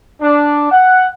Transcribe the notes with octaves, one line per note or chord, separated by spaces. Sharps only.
D4
F#5